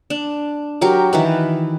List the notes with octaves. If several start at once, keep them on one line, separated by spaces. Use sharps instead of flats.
D4
F#3 G4 A#4
D#3 E3 B4